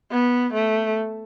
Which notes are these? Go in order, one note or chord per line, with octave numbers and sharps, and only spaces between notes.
B3
A3